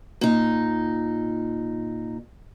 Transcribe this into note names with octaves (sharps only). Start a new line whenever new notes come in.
A#2 D#4